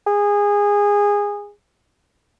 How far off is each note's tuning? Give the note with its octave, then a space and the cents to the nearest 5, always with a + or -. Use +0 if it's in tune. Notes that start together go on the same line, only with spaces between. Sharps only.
G#4 -20